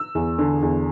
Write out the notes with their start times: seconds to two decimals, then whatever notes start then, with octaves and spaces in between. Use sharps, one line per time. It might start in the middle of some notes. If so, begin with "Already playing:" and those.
Already playing: E6
0.15 E2
0.38 D3
0.62 E2